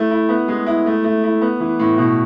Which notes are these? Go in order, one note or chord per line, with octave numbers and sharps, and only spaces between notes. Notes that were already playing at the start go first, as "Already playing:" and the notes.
Already playing: A3 E4
E4
B3
G#3
E4
A3
A3
E4
B3
E3
A2
B2